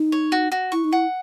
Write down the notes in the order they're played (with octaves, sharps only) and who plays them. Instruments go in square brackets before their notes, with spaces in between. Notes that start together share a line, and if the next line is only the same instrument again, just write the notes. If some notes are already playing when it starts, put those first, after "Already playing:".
Already playing: [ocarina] D#4
[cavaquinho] C#5
F#4
F#4
[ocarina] E4 [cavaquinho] C#6
[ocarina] D#4
[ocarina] E4 [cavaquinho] F#5